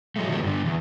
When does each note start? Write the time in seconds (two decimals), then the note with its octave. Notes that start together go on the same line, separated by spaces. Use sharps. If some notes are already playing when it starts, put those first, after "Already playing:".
0.16 A2 F3 F#3 G#3 A3
0.29 D#3 F3 F#3 G#3 A3 B3
0.43 G2 D3
0.66 E2